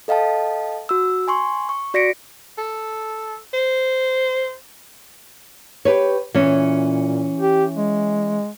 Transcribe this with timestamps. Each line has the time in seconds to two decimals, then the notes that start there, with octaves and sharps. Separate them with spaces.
0.08 A4 D#5 F5 G5 A5
0.89 F#4 E6
1.28 G#5 C6 C#6
1.69 C#6
1.94 F#4 D5 A#6 B6 C#7 D7
2.58 A4
3.54 C5
5.85 G4 B4 C#5
6.34 A#2 E3 C#4
7.40 G4
7.76 G#3